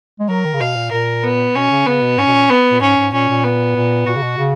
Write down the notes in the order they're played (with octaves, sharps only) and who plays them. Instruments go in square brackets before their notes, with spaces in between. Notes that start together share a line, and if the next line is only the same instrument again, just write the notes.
[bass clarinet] G#3
[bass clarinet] F#3 [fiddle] A#4
[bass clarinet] D#3
C#3
[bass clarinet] B2 [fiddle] F5
[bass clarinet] A#2
[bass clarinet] A#2 [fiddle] A#4
[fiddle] B3
[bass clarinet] B2 [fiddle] C#4
[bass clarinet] C#3
[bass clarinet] C#3 [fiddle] B3
[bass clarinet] B2
[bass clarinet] G#2 [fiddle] C#4
[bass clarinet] B2
A#2
[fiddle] B3
[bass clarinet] A#2
[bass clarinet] G#2 [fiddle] C#4
[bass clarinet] G#2
[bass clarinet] A#2 [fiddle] C#4
[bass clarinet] A#2
[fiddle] B3
[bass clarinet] A#2
[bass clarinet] A#2 [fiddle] F#4
[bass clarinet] C#3
B2
C#3